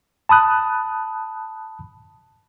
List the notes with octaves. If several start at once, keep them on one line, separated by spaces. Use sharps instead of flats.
A5 B5 D#6 F#6